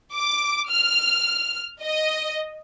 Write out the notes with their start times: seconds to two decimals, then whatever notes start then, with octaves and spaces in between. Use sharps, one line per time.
0.13 D6
0.70 F6
1.82 D#5